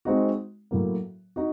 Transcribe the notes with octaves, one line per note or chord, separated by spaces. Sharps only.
G#3 C4 D#4 F#4
A2 F#3 A#3
D#4 F#4